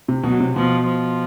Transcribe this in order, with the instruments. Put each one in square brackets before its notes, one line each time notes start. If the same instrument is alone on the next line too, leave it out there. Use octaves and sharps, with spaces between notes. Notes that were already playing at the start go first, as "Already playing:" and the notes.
[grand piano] C3
[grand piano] B2 [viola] F#3
[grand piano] C3
[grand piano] B2 [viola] F3
[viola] F3